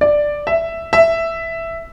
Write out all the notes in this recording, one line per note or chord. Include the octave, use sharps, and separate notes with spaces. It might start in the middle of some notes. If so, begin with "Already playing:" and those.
D5
E5
E5